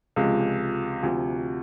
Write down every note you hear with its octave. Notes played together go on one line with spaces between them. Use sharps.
C#2 C3 F3 G#3
D2 C3 F3